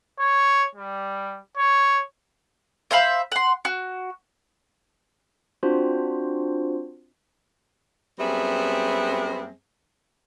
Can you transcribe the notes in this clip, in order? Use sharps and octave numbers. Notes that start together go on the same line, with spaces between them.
C#5
G3
C#5
C5 E5 F5 B5
F#5 C6
F#4
C4 D4 F4 F#4 C5
F#2 G3 B3 C4 G#4 E5